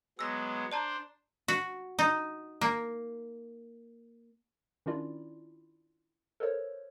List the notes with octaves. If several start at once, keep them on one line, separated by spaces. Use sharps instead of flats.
F#3 G#3 B3 E6 A#6
D4 C5 D5 A5 A#5
F#4
D#4
A#3
D#3 C#4 D4 E4 F4 D5
A4 A#4 C5 C#5